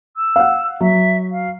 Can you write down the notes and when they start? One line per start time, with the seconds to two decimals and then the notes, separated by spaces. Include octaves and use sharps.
0.17 E6
0.36 F5 F#5
0.81 F#3 E5
1.32 F5